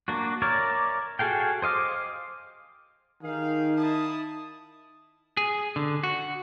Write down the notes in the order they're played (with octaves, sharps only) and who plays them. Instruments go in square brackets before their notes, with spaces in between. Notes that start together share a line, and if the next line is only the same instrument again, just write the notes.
[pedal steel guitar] A#3 D4 F#4
A#4 C#5 D5 E5
F#4 G#4 A4 F5 G5
C5 D#5 F5 D6
[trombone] D#3 [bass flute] D#4 [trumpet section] G4 G#4 F5
[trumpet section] E4 A5 D#6
[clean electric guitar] G#4
D3
F#4